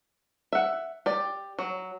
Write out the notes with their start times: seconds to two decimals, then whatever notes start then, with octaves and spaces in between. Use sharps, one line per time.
0.53 E5 F#5
1.06 G4 D5
1.59 F#3